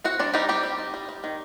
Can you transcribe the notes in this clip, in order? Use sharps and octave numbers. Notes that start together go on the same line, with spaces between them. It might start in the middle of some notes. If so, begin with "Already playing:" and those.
C4 F#4 F#5
G3 D4 D5
G3 D#4 G4
G3 C4 G4
G3
D#4
G3
G3
D#3